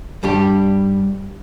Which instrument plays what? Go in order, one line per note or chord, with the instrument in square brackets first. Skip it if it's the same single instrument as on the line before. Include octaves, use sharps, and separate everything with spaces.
[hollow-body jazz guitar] G2 G3 D4 G4